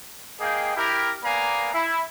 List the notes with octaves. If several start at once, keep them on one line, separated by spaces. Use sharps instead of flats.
A#3 G#4 D#5 F5 G5
E4 G4 A#4
A#3 B3 D5 F5 G#5 A#5
E4